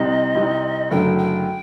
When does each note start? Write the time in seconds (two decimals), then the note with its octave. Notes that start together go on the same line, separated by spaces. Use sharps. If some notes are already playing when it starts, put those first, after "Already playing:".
Already playing: C2 C3 G3 C4 D#4 D#5
0.35 C2 C3 G3 C4 D#4
0.91 F#1 F#2 D3 F#3 A3 G5
1.18 G5